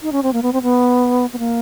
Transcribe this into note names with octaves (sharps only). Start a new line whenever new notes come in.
D#4
C#4
C4
A#3
B3
C4
B3
B3
A#3